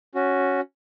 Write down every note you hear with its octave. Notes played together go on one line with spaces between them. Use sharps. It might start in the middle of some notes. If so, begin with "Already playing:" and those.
C#4 F#4